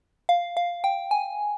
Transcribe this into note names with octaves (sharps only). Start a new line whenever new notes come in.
F5
F5
G5
G#5